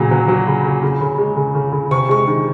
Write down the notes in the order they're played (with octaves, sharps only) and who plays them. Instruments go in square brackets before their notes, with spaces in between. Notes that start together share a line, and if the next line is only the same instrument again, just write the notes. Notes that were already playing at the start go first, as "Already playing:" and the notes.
Already playing: [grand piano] A#2 C#3 F#3
F#3
F#3
C#3
C#3
C#3
C#3
G#3
C#3
C#3
C#3
C3 C#6
G#3 C#6
D#3